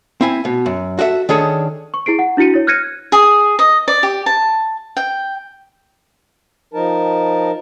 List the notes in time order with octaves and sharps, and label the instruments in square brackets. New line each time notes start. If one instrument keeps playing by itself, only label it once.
[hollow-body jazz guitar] C4 E4 G#5
B2
F#2
F#4 A4 D5 E5
D#3 C#4 D4 G#4 A4
[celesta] C#6
E4 G#4 C7 D7
F#5
D4 E4 F#4 C#7 D#7
E4 C#5
F6 F#6 G#6 A#6 C#7 D#7
[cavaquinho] G#4
D#5
D5
G4
A5
G5
[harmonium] F3 D#4 A#4 A5